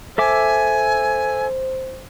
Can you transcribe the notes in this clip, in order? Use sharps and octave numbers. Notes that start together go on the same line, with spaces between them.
A4 C5 E5 G#5 D6